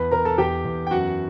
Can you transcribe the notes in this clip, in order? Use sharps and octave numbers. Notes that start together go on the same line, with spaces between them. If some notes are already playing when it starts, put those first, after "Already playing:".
Already playing: E2 B4 B5
E2 A#4 A#5
A4 A5
E2 G4 G5
E2
G5
F#2 F#4 F#5